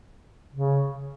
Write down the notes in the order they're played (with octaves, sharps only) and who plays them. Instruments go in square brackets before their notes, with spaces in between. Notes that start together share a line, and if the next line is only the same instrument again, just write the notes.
[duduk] C#3